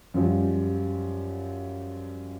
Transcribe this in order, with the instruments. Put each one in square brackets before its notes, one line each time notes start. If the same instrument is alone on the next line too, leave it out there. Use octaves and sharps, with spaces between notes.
[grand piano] F#2 F3 G3